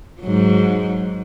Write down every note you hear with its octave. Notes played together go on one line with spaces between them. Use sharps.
G#2 F#3